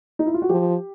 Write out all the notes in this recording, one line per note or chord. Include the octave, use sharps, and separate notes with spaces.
D#4
E4
F4
F#4
F3 G4